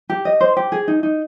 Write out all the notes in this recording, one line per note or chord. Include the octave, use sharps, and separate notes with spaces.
G4
D#5
C5
G4
G#4
D#4
D#4